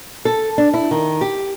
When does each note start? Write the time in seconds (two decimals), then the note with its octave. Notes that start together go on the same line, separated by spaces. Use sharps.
0.25 A4
0.58 D4
0.74 E4
0.91 D#3
1.21 G4